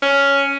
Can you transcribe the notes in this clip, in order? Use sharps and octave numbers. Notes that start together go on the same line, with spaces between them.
C#4